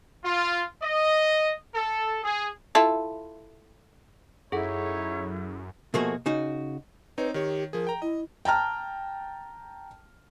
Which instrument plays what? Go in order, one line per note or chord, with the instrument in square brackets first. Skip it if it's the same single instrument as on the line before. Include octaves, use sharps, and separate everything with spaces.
[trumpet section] F4
D#5
A4
G#4
[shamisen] E4 F4 A4
[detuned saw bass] F#2 [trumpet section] C#4 D#4 C#5 [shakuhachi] E4 [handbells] G#4 A4 F#5
[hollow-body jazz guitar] B2 F3 A3 A#3 F#4 G#4
C#3 D#4 F#4
[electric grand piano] C4 D#4 C#5 [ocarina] B4
[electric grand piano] D#3 C#5 [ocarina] G4
[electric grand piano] F3 G#4 [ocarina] A#4
[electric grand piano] G5 A#5
[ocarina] E4 [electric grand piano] D#5
[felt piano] G5 A5 A#5 F6